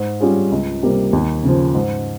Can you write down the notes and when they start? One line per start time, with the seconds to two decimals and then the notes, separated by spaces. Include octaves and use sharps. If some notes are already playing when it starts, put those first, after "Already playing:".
Already playing: G#2
0.20 G3 C#4 F4 G#4
0.52 C#2
0.83 C3 G3 A#3
1.13 D#2
1.44 C#3 F3
1.74 G#2